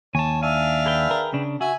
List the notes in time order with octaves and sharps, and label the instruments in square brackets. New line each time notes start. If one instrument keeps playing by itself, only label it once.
[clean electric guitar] D#2 [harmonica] C#5 [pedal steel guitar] G#5 A5
[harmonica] D4 E5 F5 [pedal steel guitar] G#5
[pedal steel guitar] G#4 B4 G5
[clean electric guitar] A#4
C#3 D4
[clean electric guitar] F#4 [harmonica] E5 G#5